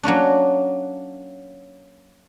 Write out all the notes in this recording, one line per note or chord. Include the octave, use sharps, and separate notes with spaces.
F#3 A#3 C#4 D4